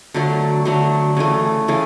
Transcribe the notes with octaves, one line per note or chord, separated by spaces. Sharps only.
D3 F#3 A3
D3 F#3 A3
C#3 E3 A3
C#3 E3 A3